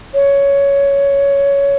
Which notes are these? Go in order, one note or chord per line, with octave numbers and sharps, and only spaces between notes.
C#5